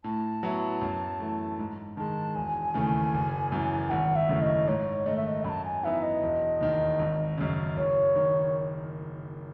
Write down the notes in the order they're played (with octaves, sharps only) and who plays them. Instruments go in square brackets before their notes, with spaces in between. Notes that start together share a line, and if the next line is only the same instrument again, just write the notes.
[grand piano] A2 [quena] A5
[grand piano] F#3 B3 E4
F#2
E3 A3
G#2
[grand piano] D#3 G#3 [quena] A5
[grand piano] E1 [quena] G#5
[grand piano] D#2 C#3 E3 A3
F#1
F#2 E3
[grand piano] G#1 [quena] F#5
[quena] E5
[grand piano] F#2 C#3 E3 A3
[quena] D#5
[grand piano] G#2 [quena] C#5
[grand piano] D#3 A3 [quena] D#5
[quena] E5
D#5
[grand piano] F#2 [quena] B5
[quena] A5
G#5
[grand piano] E3 B3 D#4 [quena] E5
[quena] D#5
[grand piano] E1
D#2 D#3
G#1
F#2 C#3
[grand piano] F#1 [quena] C#5
[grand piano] D#3